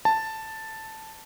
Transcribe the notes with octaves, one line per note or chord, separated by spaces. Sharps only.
A5